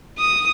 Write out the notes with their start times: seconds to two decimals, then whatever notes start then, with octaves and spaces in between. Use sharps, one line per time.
0.19 D#6